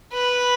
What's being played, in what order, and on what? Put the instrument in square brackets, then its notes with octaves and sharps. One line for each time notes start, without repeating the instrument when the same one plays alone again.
[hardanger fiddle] B4